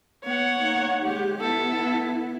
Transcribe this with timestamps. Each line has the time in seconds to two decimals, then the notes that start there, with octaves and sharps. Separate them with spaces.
0.24 B3 C#5 F#5
0.60 A#3 D#4
1.03 G#3 G4
1.41 B3 E4 A4